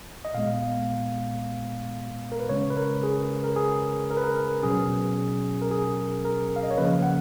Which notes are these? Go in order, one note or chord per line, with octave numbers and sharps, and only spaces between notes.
D#5
A#2 G#3 B3 F5
A#4
B4
C#3 G#3 C#4 C#5
B4
A#4
G#4
A#4
G#4
A#4
B4
A#4
B2 F#3 C#4 G#4
A#4
G#4
A#4
F5
D#5
C#5
C#3 F3 A#3 C#4 B4
F#5